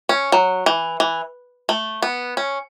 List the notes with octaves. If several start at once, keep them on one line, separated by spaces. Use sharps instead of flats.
C#4
F#3
E3
E3
A3
B3
C#4